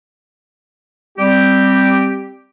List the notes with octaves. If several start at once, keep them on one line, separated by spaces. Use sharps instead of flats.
G3 C4 G4